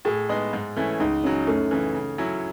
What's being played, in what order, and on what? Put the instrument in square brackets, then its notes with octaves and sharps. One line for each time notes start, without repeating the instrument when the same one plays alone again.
[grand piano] A2 [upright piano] G#4
[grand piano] G#3 B3 D#4
G#2
E3 A3 C#4 E4
[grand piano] C#2 [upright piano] D#4
[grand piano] C#3 F#3 [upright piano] C#4
[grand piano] F#2 [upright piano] A3
[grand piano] C#3 E3
C#3
F#3 C#4 E4